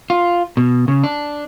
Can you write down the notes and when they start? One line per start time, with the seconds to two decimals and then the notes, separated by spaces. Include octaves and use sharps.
0.10 F4
0.57 B2
0.88 C#3
1.04 D4